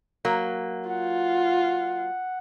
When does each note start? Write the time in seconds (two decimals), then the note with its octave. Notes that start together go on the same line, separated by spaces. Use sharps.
0.25 F#3 A#3
0.90 F4 F#5